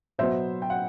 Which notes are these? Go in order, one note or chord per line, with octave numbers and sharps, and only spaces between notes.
B2 F#3 B3 C5 E5
G5
F#5